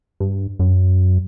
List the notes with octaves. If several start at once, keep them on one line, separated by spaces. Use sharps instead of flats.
G2
F#2